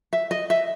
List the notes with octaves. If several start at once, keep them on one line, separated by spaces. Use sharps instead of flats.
E5
D#5
E5